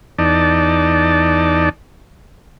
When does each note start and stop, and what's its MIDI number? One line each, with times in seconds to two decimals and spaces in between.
0.18 1.69 40
0.18 1.69 63
0.18 1.69 74
0.18 1.69 81